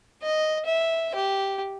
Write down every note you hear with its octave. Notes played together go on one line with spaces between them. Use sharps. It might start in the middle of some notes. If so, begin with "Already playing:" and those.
D#5
E5
G4